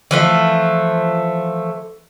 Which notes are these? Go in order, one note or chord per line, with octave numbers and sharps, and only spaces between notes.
E3 F3 A3